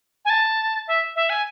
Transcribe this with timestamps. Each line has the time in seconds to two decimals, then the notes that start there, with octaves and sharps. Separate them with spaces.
0.25 G#5
0.30 A5
0.88 E5
1.16 E5
1.30 G#5